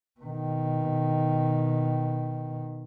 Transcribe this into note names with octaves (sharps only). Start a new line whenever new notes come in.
B2 D#3